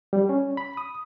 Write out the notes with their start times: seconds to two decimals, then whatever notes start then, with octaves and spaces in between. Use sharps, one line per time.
0.13 G3
0.29 C#4
0.57 B5
0.77 D#6